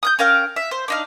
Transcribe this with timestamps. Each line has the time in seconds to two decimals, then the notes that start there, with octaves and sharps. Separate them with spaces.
0.03 D#6 F#6 G6
0.19 C#4 A#4 F5 G5
0.56 E5
0.71 C5
0.88 D4 D#4 F5